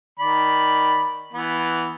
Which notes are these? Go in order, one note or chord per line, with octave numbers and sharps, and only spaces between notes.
D#3 D5 B5
E3 B3